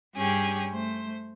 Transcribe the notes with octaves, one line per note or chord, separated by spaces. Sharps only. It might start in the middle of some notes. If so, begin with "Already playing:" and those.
G2 C#4 G4 G#4 G5
A3 C5